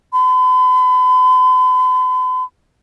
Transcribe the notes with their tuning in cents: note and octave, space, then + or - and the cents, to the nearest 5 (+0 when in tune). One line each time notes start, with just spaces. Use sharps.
B5 +45